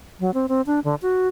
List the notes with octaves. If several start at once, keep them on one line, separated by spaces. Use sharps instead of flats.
F#3
C4
C4
D4
D3
F#4